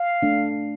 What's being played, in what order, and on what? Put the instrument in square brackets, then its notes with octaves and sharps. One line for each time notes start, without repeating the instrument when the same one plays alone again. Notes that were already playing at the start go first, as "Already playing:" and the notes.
Already playing: [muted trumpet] F5
[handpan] A3 D4